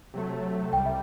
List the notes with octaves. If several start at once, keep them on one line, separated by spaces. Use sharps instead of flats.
C3 F#3 A3
C2 C3 G3 G5
E5